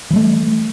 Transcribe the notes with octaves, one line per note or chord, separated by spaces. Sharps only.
E3 G3 A3